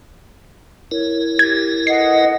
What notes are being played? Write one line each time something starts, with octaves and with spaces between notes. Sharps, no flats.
E4 A#4 C#5
G4 G#6
A4 B4 D#5 F#5 C7